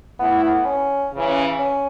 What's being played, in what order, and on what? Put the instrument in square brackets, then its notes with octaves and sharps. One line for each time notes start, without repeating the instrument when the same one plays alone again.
[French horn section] A2 A3 E4 [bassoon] B3
[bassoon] B3
C#4
[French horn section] C#3 E3 C#4
[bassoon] C#4